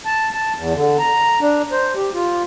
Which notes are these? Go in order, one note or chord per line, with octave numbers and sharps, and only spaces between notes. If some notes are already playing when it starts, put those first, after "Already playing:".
A5
A5
E2
D3
A#5
D4
C5
G4
F4